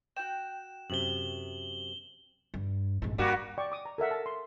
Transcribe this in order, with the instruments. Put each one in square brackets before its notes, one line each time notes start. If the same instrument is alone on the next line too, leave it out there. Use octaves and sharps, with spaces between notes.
[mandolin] F#4 G5 [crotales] E7
[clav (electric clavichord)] F#2 C3 [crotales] F#7 G7
[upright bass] G2
A1 G#2
[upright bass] G2 [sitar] G3 A#3 F#4
[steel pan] D5 G5 C#6
D6 D#6
A#5
A4 A#4 E5 F#5
A5
C6